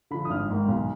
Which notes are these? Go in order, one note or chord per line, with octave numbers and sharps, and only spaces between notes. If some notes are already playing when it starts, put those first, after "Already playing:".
D3 F3 B5
D#6
G#1 F6
G#2 D#3
B1